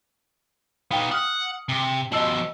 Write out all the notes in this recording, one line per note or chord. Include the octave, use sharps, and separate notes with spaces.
B3 D#4 F5 G5
F#5 D#6 F6
C3
B2 F3 D#5 E6 F#7